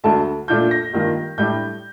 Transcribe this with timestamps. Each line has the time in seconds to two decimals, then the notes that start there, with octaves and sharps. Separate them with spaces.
0.04 D2 D3 A3 A5
0.48 A#2 A3 D4 F4 G6
0.71 A#6
0.93 G2 D#3 A#3 F4
1.38 A2 G3 D4 G6